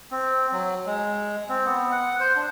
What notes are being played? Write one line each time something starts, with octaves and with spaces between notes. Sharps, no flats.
C4
F#3
G#3
C4
B3
F#5
C5
D4